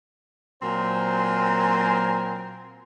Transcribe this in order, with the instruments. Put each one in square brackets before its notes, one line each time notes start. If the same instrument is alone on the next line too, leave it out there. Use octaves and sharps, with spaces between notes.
[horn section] A#2 F#3 C4 A#4 C5 G#5